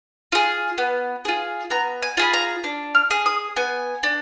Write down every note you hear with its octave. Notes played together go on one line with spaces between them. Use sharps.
F4 G#4
B3
F4 G#4
B3 A#5
G#5
F4 G#4 B5
A#5
D4
F6
G#4
D#6
B3 G#5
D4